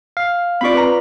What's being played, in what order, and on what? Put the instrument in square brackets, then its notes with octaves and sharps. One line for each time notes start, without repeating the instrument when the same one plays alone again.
[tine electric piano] F5
[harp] C4 F4 D5 [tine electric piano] B5 C#6
[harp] B4 A#5